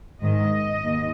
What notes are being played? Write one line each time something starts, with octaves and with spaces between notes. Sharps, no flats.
G#2 D#3 G#3 D#5
D#2